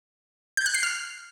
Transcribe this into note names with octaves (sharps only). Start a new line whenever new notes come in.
G6
F#6
C7
F6